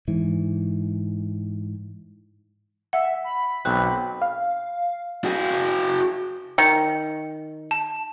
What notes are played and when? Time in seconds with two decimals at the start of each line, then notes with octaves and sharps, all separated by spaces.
0.08 G#2 E3
2.93 E5 F#5
3.24 B5
3.65 B1 C4 F#6
4.22 F5
5.24 F#4 G#4
6.58 D#3 C#7
7.71 A5